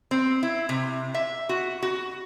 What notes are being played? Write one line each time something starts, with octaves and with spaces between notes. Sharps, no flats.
C4
E4
C3
E5
F#4
F#4